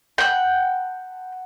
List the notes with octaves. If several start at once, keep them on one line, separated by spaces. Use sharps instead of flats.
F#5 G5 A5 B5 F#6